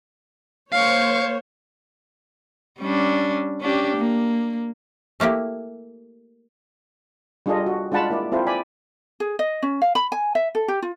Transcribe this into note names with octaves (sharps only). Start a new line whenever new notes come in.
A#3 C5 C#5 F5 C#6
G3 C#4 D4
C#4 D4 G4
A#3
A3 A#3 E4 G4
G3 D4 F4 G#4 A4 D#5
F#4
G#3 D4 F4 F#5 A5 B5
A#3 E4 D5
C4 E4 F4 A4 C5
D5 G#5 B5
G#4
D#5
C#4
F5
B5
G#5
E5
A4
G4
F4